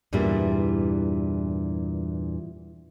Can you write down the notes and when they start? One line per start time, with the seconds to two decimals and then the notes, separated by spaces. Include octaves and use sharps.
0.13 E2 G2 A#2 E3 G3 E4